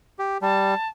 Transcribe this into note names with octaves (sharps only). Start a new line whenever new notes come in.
G4
G3 A5